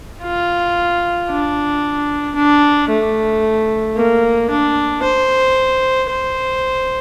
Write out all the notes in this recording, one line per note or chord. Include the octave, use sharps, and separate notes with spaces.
F4
D4
D4
A3
A#3
D4
C5
C5